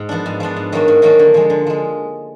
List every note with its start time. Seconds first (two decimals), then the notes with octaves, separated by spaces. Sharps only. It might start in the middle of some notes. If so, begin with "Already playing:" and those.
Already playing: G#2
0.09 F3 B3 D4
0.26 G#2
0.40 F3 B3 D4
0.56 G#2
0.72 D#3 F#3 A#3 D4
0.88 G#2
1.02 D#3 F#3 A#3 D4
1.19 D3
1.34 F3 G#3
1.50 D3
1.67 F3 G#3